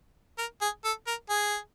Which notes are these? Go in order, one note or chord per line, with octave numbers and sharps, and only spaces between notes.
A#4
G#4
A4
A#4
G#4